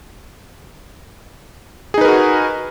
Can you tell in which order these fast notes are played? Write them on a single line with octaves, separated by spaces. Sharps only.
G#4 D#4 B4 A#4 F#4